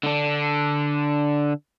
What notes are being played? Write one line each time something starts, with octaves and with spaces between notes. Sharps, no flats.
D3 D4